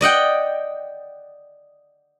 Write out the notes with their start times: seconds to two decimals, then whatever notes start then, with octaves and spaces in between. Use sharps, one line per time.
0.01 D5 D#5 F#5 G5